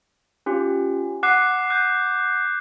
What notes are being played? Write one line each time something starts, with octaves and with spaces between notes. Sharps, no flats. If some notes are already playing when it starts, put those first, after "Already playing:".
C#4 F4 G4
F#5 D6 F#6 C7
F#6 G6